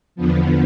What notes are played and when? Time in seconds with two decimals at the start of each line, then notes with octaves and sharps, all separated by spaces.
0.16 E2 D3 F3 B3